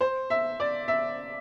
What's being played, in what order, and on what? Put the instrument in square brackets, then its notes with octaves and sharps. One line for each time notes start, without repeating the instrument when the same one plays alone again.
[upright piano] C5
E5
D5
E5